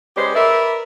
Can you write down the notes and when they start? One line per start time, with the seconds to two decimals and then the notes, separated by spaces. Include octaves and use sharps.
0.16 G#3 C#4 G4 B4 C5 D5
0.35 A#4 B4 D5 E5